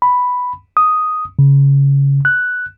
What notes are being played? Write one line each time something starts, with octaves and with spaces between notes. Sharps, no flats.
B5
D#6
C#3
F#6